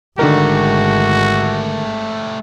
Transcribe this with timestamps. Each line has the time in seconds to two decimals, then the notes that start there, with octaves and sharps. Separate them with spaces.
0.19 G#1 D3 D#3 G#3 A3 F#4 G4 A#4